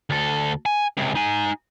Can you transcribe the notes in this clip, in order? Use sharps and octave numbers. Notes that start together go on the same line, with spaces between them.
D2 A4
G#5
C#2 C3
D#4 G#5